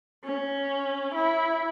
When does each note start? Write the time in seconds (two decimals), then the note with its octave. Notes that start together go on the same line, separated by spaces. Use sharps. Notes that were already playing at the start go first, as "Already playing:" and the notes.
0.25 C#4
1.15 E4